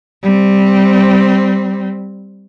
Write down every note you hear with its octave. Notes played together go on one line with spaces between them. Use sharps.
G3 C4